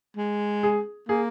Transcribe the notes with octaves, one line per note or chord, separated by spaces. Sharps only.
G#3
G#4
A#3 G#4